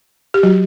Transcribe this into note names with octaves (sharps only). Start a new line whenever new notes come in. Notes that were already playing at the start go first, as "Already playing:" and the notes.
G4
F#3 F#4